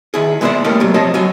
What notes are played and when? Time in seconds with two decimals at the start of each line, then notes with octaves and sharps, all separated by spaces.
0.14 D#3 E4 G#4
0.41 G#3 B3 E4 B4 C5 D5
0.64 G3 A3 A#3 C#4 G4 D#5
0.80 C3 F#3
0.94 F3 C4 C#5 D#5 A5
1.14 F#3 F5 G#5